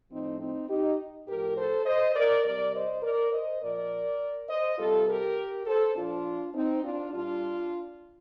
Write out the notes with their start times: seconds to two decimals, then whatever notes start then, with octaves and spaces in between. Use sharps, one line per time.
0.10 A2 F3 C4 D#4
0.40 C4 D#4
0.69 D#4 G4
1.27 A2 F3 G4 A#4
1.57 A4 C5
1.86 C5 D#5
2.15 A#4 D5
2.45 C3 G3 A#4 D5
2.74 C5 D#5
3.03 A#4 D5
3.32 C5 D#5
3.62 A#2 F3 A#4 D5
4.49 C5 D#5
4.78 C3 G3 F4 A4
5.08 G4 A#4
5.66 A4 C5
5.96 A#2 F3 D4 F4
6.54 C4 D#4
6.83 D4 F4
7.13 A#2 G3 D4 F4